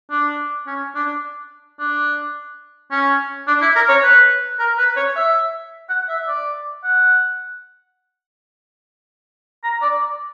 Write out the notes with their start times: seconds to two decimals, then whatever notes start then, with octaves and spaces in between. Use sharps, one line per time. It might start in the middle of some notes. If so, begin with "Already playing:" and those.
0.11 D4
0.67 C#4
0.95 D4
1.79 D4
2.91 C#4
3.47 D4
3.61 E4
3.76 A#4
3.89 C#5
4.03 B4
4.59 A#4
4.78 B4
4.96 C#5
5.16 E5
5.90 F#5
6.09 E5
6.27 D5
6.84 F#5
9.64 A#5
9.82 D5